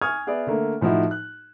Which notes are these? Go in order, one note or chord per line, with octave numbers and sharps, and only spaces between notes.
G#5 C#6 D#6 F6 G#6
B3 G#4 D5 E5
D3 A3 A#3
A2 F3 D#4 E4 F#4
F#6